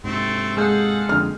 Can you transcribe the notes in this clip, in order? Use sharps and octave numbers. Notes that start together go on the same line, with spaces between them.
G#2 C3 A3 C4
G#3 G#4 A4 F5 F#5 G6
F2 D3 F6